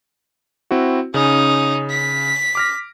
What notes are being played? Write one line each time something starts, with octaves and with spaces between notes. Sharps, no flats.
C4 E4 F#4
C#3 C#4 D#4
B6
D6 F6 A#6